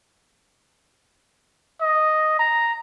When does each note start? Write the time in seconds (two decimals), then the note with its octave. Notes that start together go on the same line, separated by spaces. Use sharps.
1.81 D#5
2.39 A#5